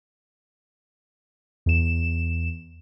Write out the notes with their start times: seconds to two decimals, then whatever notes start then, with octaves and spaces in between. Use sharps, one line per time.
1.66 E2 E7